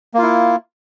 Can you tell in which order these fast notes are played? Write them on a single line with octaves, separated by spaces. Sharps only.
A#3 F4 E4